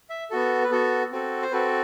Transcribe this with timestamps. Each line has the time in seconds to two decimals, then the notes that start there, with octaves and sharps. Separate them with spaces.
0.10 E5
0.30 B3 F#4 A4
0.64 B4
0.70 B3 F#4 A4
1.12 C4 F#4 A4
1.42 C5
1.51 C4 F#4 A4 B4